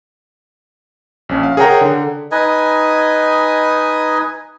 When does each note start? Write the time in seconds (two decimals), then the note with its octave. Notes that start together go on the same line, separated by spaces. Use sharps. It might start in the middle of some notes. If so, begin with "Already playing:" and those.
1.29 A#1 C#4
1.43 F5
1.57 G#4 A#4 C#5 F#5 G5 A#5
1.81 D3
2.31 D#4 B4 D#5 G#5